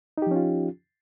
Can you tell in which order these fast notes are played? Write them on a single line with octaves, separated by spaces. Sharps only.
D#4 G4 F3 C#4 F4